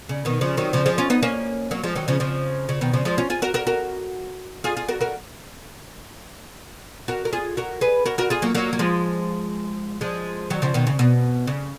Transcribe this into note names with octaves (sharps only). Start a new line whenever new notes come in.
C#3
B2 D#3
C#3 F3
D#3 F#3
C#3 F3
F3 G#3
C#4 F4
B3 D#4
A#3 C#4
F#3 A#3
F3 G#3
D#3 F#3
C#3 F3
C#3 F3
C#3
B2 D#3
C#3 F3
F3 G#3
C#4 F4
F4 G#4
F#4 A#4
F#4 A#4
F#4 A#4
F4 G#4
F4 G#4
F#4 A#4
F#4 A#4
F#4 A#4
A#4
F4 G#4
F#4 A#4
G#4 B4
F#4 A#4
F#4 A#4
F4 G#4
F#3 A#3
F#3 A#3
F#3
F3 G#3
F3 G#3
D#3 F#3
C#3 F3
B2 D#3
C#3
B2
C#3